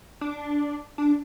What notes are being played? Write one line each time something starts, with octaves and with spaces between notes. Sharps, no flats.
D4
D4